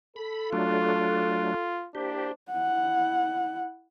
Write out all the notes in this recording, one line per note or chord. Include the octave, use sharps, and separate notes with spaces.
A4 B5
F#3 A3 D4 F4
A#3 D4 E4 G4 C5
E4 F#5